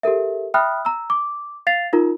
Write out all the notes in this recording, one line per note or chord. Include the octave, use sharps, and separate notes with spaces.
G4 A4 A#4 E5
E5 G5 B5 D#6 F6 F#6
A#5 E6
D6
F5 A6 C7 F7
D#4 F4 A#4 A#5